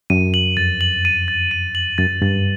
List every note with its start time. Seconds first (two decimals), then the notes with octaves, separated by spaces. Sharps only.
0.10 F#2 D#7
0.34 F#7
0.57 F2 A6
0.81 F#7
1.05 D#7
1.28 A6
1.51 D#7
1.75 F#7
1.98 F#2 A6
2.22 G2 A6